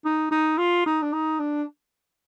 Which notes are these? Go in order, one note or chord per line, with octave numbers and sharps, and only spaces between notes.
D#4
D#4
F4
D#4
D4
D#4
D4